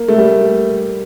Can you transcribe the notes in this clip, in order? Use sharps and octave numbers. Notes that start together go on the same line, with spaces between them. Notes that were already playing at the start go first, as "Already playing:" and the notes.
Already playing: A#3
A3
G3